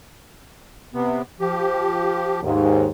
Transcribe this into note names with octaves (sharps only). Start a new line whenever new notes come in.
C3 B3
F3 G4
D#2 G#2